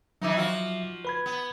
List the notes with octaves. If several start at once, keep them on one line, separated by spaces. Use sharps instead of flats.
D#3 E3 F#3 D#4 E5 D6
F3 F4 F#4
B4 B5 G#6
B3